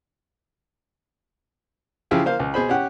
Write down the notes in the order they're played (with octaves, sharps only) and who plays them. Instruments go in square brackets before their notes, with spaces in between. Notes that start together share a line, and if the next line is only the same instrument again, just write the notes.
[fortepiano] C#3 F3 E4 F4 G4 G#4
A#3 C5 F5
C#2
B2 G#4 C5 B5
C#4 G4 F#5